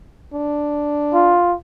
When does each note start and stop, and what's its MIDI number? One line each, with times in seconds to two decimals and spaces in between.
0.33 1.38 62
1.14 1.55 65